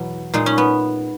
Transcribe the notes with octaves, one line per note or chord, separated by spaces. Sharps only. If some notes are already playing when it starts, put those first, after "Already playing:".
Already playing: E2 B2 F#3
A#2 G#3 D#4
C#4
B3